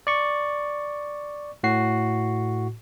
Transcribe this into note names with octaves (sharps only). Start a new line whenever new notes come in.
D5 C#6
A2 F#4 C7